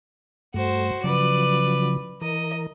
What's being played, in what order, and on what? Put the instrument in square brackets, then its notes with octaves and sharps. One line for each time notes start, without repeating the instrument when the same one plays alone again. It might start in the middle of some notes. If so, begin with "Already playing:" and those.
[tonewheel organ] G2 A3 [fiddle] F#4 C5
[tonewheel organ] C#3 F3 F#3 [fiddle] B4 D5
[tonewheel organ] E3 A#4 [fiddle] D#5